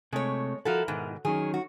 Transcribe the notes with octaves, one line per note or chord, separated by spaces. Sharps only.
C3 G#3 A3 C#5
F3 E4 F#4 A4 A#4
G#2 B2 D#3
D#3 F#3 C#4 G#4
F#4